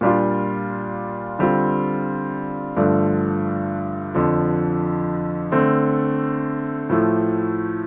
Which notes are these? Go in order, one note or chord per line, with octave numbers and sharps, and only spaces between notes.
A#2 G3 D4 F4
D3 G3 C4 F4
G2 D3 F3 A3 D4
F2 D3 F3
D3 A3 C4
A2 F3 A3